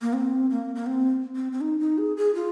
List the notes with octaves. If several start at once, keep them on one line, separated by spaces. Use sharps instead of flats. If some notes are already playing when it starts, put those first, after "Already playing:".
A#3
C4
A#3
A#3
C4
C4
C4
D#4
D#4
G#4
G#4
F4